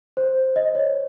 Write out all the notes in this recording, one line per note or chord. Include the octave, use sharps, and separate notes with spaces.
C5
D#5
C#5